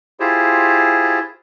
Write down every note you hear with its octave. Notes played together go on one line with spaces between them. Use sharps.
E4 F4 G4 G#4 C5